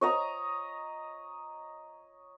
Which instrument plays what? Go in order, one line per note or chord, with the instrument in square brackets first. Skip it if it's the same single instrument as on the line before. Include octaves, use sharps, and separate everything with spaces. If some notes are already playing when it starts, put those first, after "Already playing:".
[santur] C#5 D#5 A#5